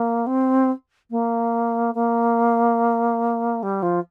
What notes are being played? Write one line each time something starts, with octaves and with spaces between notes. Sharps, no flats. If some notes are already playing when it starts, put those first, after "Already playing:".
Already playing: A#3
C4
A#3
A#3
G3
F3